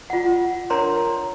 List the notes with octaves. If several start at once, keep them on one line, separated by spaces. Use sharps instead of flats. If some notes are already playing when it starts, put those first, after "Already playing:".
F4 F#5
D4 A#4 C#5 A#5 C6